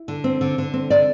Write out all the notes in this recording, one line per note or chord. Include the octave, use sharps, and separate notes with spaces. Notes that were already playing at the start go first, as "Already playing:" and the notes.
Already playing: E4
D3
C4
D3
D3
C4
D3 D5